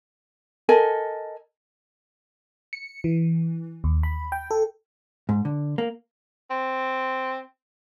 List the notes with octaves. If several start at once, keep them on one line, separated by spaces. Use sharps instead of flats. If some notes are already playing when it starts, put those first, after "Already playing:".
A4 A#4 D#5 G#5
C#7
E3
D#2
B5
G5
A4
G#2
D3
A#3
C4